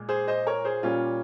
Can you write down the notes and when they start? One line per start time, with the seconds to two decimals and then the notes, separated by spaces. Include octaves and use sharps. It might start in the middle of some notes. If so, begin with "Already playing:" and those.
Already playing: A#2 G#3
0.09 G#4 C5
0.27 C5 D#5
0.46 A#4 C#5
0.65 G#4 C5
0.83 A#2 G3 A#3 C#4 F4